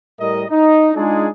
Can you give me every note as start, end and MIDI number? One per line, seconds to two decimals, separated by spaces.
0.19 0.42 45
0.19 0.42 55
0.19 0.42 70
0.19 0.42 75
0.50 0.89 63
0.94 1.27 56
0.94 1.27 62
0.94 1.27 63
0.94 1.27 65
0.94 1.27 68
0.94 1.27 74